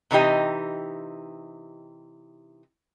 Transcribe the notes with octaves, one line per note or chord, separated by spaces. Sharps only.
C3 E3 D#4 G4 D#5